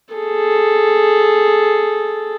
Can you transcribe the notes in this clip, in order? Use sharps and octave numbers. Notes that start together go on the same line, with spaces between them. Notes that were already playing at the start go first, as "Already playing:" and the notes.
G#4 A4